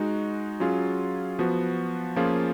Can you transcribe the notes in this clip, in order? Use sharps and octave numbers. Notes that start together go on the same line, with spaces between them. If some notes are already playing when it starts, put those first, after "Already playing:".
Already playing: G#3 D#4 F#4
F#3 C#4 F4 G#4
F3 B3 F#4
F3 A#3 C#4 F4 G#4